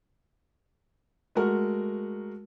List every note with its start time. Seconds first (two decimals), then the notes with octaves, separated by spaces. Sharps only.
1.35 G#3 A3 F#4 A#4